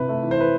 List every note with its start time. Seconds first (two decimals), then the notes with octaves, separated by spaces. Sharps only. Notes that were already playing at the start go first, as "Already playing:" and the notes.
Already playing: C3 E4 B4
0.08 A3
0.23 E3
0.31 C5
0.37 E4 B4